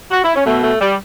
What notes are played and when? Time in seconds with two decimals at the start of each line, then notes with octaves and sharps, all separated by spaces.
0.11 F#4
0.23 E4
0.34 C#4
0.44 B2 A3
0.62 A3
0.79 G3